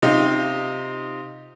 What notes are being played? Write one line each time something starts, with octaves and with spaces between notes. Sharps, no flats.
C3 D#4 F4 G4